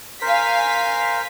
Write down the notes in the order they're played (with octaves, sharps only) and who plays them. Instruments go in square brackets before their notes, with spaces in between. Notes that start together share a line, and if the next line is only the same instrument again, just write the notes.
[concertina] A#4 C5 [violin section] F5 G#5 B6